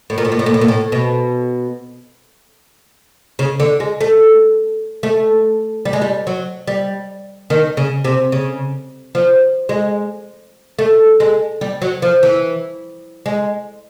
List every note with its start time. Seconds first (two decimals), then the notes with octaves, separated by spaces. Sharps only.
0.10 A2
0.18 A#2
0.25 A2
0.32 A#2
0.39 A2
0.46 A#2
0.54 A2
0.61 A#2
0.68 A2
0.92 B2
3.39 C#3
3.60 D3
3.80 G#3
4.01 A3
5.03 A3
5.85 G3
5.93 G#3
6.01 G3
6.27 F#3
6.67 G3
7.50 D#3
7.77 C#3
8.05 C3
8.32 C#3
9.15 F3
9.69 G#3
10.79 A3
11.20 G#3
11.61 G3
11.82 F#3
12.02 F3
12.23 E3
13.26 G#3